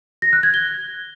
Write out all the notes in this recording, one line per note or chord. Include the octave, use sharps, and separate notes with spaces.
A#6
F#6
G#6
G7